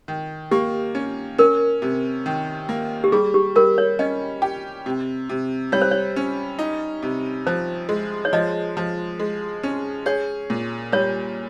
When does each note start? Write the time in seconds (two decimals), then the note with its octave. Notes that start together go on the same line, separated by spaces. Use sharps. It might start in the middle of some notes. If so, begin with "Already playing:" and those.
0.08 D#3
0.51 A#3 G4
0.95 C#4
1.38 C#4 A#4
1.82 C3
2.26 D#3
2.69 A#3
3.04 G4
3.12 G3 G#4
3.34 G4
3.56 G3 A#4
3.78 C#5
3.99 C#4 D#5
4.42 G4
4.86 C3
5.29 C3
5.72 G3 C#5
5.82 C5
5.91 C#5
6.16 C#4
6.59 D#4
7.03 C3
7.47 F3 C5
7.89 G#3
8.25 C#5
8.33 F3 D#5
8.77 F3
9.20 G#3
9.63 C#4
10.06 G#4 C#5
10.50 A#2
10.92 G3 C#5